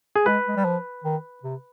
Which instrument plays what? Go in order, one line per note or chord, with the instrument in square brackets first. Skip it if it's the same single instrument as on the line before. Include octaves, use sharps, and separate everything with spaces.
[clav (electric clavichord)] G#4
[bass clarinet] G#3 [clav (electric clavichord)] B4
[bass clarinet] G#3
G3
F3
D#3
C3